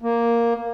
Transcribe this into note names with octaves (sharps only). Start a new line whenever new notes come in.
A#3